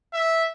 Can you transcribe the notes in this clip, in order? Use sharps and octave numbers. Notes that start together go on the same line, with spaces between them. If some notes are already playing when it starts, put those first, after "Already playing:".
E5